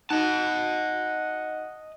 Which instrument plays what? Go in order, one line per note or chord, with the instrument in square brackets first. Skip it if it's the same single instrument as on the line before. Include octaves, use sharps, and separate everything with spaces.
[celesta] D#4 F#4 [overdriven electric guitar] D#5 A5 [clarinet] F#5